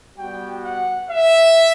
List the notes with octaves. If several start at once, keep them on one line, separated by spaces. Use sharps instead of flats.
G3 B3 F#4 G5
F#5
E5